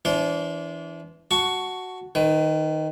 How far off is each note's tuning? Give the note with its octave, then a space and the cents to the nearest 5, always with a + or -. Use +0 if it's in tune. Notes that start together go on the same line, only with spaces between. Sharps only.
E3 +0 D4 -35 C5 -5
F#4 +0 A5 +0 C#6 +10
D#3 +0 B4 +35